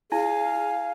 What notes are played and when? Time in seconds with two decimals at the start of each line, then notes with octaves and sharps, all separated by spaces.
0.12 E4 G#4 F5 G#5